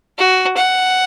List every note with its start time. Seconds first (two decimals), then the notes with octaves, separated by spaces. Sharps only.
0.19 F#4
0.57 F#5